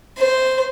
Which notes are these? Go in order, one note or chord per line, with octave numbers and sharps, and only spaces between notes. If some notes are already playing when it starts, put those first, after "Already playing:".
C5